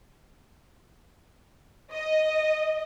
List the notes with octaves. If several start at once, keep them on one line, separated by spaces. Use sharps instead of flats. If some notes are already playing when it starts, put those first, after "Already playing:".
D#5